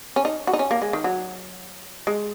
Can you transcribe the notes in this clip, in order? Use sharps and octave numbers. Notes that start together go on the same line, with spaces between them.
C#4
D#4
F#4
D#4
C#4
A#3
G#3
D#3
F#3
G#3